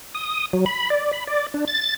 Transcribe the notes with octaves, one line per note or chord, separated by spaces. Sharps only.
D#6
F#3
B5
D5
B5
D5
D4
A6